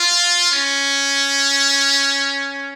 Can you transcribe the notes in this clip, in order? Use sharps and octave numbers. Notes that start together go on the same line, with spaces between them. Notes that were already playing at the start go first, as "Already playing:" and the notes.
Already playing: F4
C#4